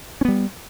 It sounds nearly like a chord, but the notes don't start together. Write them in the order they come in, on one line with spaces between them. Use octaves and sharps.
C#4 B3 G3